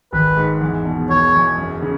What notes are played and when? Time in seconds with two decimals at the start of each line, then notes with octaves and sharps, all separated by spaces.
0.13 G#1 B4
0.37 G#2
0.61 E2
0.85 B2
1.09 E1 C#5
1.35 E2
1.58 F#2
1.82 C#3